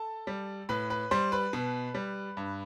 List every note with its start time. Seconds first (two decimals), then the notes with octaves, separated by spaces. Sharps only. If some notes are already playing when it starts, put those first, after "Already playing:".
Already playing: A4 A5
0.27 G3
0.69 A2 B4 B5
0.90 B4 B5
1.11 G3 C5 C6
1.32 B4 B5
1.53 B2
1.94 G3
2.37 G2